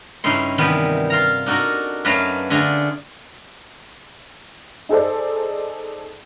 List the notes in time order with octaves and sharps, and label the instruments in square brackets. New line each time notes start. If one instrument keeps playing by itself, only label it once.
[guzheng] G2 C#3 D#4 E4 C6
C3 D#3 E3 G3 B3
F4 F5 A#5
D4 D#4 F#4 A4 A#4
F#2 F#3 A3 B4 F5 A#5
D3 A3 F4 G#4 A#5
[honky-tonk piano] D#4 G#4 A4 C5 D5